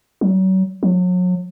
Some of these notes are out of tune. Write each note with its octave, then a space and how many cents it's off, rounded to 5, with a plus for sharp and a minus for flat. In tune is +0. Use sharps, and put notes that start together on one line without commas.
F#3 +35
F#3 -35